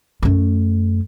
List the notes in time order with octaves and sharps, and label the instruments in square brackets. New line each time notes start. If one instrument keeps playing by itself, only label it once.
[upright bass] F#2 A3